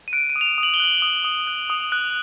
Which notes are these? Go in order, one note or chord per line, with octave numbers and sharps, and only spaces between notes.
D#7
F#6 D7
D#7
D#6
F7
E7
D#6
F#7
G7
F#6 F#7
D#6
D#6
F#6
D#6
F#6